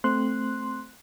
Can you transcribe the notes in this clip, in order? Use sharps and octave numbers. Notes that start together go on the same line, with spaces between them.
A3 C4 C6 F#6